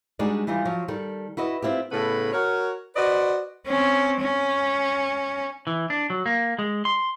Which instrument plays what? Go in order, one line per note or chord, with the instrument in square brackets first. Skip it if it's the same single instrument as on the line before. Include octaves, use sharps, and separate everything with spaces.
[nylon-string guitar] G3 G#3 D4 D#4 F#4 D5
E3 G3 D#4 F4
F3 F#3
D#3 G3 A4
E4 F#4 B4 D#5
C4 E4 F4 G4
[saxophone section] A2 C#3 B3 A4 B4
F#4 A#4 C#5
F#4 B4 C5 D5 D#5
[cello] C4 C#4
C#4
[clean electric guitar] E3
D4
F#3
A#3
G#3
C6